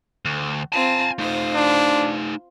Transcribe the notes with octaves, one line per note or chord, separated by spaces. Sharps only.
D2
C4 F4 G#5 A5
A3 D#4 F4 C5
D4